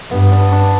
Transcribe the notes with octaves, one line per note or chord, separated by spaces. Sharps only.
G2 B3
D4
D4